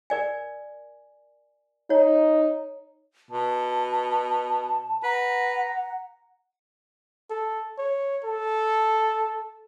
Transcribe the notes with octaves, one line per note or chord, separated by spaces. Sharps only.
A#4 D5 G#5
D#4 C#5
B2 A5
B4 F#5 A#5
A4
C#5
A4